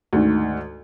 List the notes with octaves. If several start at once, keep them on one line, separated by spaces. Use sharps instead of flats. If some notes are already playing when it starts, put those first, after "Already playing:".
D2 G#2 D#3